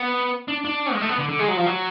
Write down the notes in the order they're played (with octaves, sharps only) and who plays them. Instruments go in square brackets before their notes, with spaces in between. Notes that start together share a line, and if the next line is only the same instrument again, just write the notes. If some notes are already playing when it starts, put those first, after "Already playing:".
Already playing: [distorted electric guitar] B3
D4
D4
G#3
A3
B3
D3
D3
G#3
F#3
F3
F#3